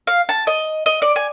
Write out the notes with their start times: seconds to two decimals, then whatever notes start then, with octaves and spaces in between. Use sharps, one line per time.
0.07 F5
0.29 A5
0.47 D#5
0.86 D#5
1.02 D5
1.16 G#5